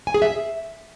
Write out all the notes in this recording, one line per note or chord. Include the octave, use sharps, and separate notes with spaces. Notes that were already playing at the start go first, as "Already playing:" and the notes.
G#5
G#4
E5